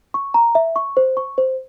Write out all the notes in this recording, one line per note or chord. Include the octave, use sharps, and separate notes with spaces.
C#6
A#5
E5
C#6
C5
C#6
C5